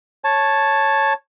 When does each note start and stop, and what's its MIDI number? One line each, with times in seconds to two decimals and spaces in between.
0.24 1.13 73
0.24 1.13 81